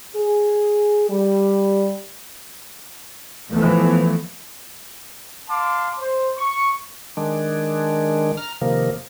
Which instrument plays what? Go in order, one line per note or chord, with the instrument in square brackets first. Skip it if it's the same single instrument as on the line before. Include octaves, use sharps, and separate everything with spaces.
[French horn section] G#4
G3
[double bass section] E3 F3 A3 B3
[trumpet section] F5 A5 C6 D6
C5
C#6
[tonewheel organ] D#3 G#3 D4
A#5 F6
C3 D#3 F3 A#3